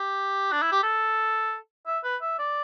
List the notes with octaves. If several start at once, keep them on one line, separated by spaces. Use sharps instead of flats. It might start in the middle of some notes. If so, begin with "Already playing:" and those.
Already playing: G4
D4
E4
G4
A4
E5
B4
E5
D5